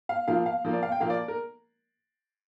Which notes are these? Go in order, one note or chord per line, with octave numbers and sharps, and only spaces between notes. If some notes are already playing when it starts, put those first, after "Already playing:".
F5
A#2 F3 A#3 F5
F5
A#2 F3 A#3
D5
F5
G5
A#2 F3 A#3 F5
D5
A#4